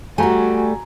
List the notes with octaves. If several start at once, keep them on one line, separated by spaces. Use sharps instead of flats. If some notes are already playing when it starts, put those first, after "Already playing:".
G3 A3 F#4 G#5 A#5